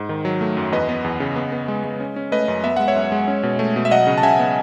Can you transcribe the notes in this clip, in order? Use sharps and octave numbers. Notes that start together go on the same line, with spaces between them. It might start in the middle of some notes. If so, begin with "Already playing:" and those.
Already playing: G#2
D#3
F#3
A3
F#2
E2 B4 D#5
B3
E2
C#3
B3
B3
G#3
G#3
C#4
C#4
A3 B4 D#5
F#2
B3 E5
G#3 F#5
C#5 E5
F#2
G#3
C#4
B2
A3
B2
E5
F#3 D#5 F#5
C#3
A5
C#3 E5 G#5
B3